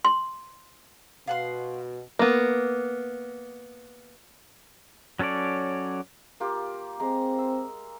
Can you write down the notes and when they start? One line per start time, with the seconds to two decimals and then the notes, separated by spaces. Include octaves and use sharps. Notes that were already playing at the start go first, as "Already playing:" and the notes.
0.05 C6
1.27 B2 F5 F#5 C6
2.19 A#3 B3
5.19 F#3 C#4 A4 C#5 D5
6.40 A#3 F4 G4
7.00 G#3 C4 A#5
7.38 E6